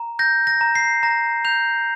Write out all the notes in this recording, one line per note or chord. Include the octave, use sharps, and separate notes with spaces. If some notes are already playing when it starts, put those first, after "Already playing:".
Already playing: A#5
G6 A#6
A#6
A#5
C7
A#5 A#6
G6 F7